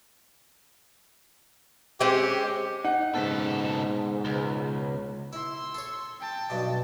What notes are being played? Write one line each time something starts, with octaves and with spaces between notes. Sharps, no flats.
G#3 C4 C#4 G4
D#4 F#5
C#2 G#2 B2 A4
C#2
E4 C6 E6
A4 C#5
G5 A5
B1 G2 B2